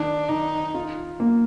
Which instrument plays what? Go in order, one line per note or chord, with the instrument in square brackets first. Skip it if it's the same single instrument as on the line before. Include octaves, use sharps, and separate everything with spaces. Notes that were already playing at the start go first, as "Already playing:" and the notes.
Already playing: [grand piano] D#3 [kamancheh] D4
[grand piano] D#3 [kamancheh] D#4
[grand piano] F4
A#3